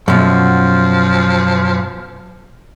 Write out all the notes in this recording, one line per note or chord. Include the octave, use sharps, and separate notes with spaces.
F#2 B2 F3